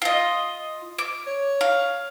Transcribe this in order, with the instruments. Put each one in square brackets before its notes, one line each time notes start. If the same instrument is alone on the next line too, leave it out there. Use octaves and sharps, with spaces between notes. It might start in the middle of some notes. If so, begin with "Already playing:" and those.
[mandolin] F4 D#5
D6
[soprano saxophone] C#5
[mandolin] F5